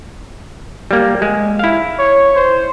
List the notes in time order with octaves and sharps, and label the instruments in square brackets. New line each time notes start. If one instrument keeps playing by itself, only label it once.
[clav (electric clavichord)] G3 A#3
G#3
E4 F5
[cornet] C#5
C5